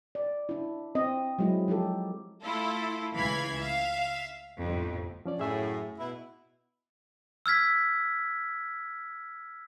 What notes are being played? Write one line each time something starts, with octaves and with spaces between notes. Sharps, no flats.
D5
D4 E4
C4 D#5
F#3 G#3 E4
F3 D#4 G4 A4
A3 E4 F4 A4
C#2 E3 F5 B5 G#6
E5 F5
G1 F2 A2
F3 C#4 D5
F#2 A2 G#4 E5 G#5
B2 E4
E6 F6 G#6 B6